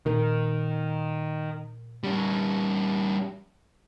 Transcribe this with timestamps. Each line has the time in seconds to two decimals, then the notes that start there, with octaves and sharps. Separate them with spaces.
0.06 A#2 D#3 A#4
2.04 G3 C#4